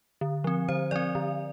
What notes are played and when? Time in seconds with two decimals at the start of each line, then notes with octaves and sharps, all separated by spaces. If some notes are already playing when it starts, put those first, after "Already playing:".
0.21 D3
0.44 F3 C4
0.69 D3 C5
0.91 F3 C4 D5
1.15 D3